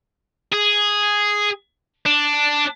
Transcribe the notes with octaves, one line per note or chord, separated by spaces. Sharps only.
G#4
D4